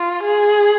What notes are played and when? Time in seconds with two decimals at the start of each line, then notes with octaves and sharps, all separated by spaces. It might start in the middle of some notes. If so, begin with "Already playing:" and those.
Already playing: F4
0.25 G#4